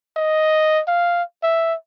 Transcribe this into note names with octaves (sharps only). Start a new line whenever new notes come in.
D#5
F5
E5